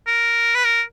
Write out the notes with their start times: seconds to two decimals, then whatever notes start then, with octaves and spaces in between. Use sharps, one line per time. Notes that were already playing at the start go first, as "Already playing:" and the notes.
0.07 A#4
0.55 B4
0.65 A#4